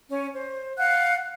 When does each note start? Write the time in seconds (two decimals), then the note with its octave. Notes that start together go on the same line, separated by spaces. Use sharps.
0.10 C#4 C#5
0.33 C5
0.78 F5 F#5 F#6